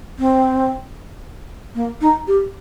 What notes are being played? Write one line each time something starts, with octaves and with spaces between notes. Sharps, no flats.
C4
A#3
D#4
G4